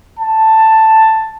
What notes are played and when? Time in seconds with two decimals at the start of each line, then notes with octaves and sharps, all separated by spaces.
0.18 A5